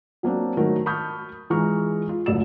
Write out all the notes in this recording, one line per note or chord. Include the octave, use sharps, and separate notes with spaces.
F#3 A#3 C4 D4
D#3 F#3 A3 A#4
A5 B5 C#6 D#6 F6 G6
E3 G#3 F4 A#5 C#6 F6
F4
F#1 D2 A#2 E6 E7